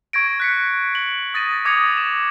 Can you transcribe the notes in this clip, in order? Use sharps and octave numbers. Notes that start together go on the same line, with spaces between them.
C#6 G#6 A#6 D7
F#6 B6 C#7
F#7
D#6 A6 A#6 D#7
D6 D#6 G#6 A#6 C#7 F7
E7